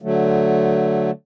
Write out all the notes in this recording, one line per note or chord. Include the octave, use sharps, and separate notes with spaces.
D3 F#3 A3